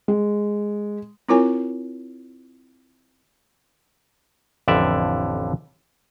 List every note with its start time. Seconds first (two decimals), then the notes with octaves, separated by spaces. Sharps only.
0.08 G#3
1.29 C4 E4 F4 A#4 C#5 G#5
4.68 A1 F2 D3 D5 E5